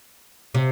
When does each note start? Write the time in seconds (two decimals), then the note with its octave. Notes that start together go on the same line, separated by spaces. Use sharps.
0.54 C3